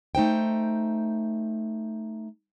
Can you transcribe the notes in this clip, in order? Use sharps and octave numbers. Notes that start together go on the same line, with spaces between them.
A3 D#4 C5 G5